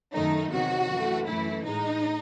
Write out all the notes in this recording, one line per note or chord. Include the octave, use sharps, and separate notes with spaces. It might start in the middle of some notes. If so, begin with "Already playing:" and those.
F#2 D#3 A3 D#4
E2 C3 D#3 F#3 F#4
F#2 E3 A3
F#2 E3 A3 E4
A2 G#3 D#4